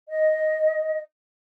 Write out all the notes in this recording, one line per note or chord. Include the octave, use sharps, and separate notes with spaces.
D#5